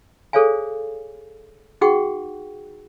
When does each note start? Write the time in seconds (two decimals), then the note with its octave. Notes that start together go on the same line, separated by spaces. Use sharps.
0.33 G#4 A4 C5 C#5 F5 G#5
1.81 D#4 F#4 G#4 F#5 G5 C#6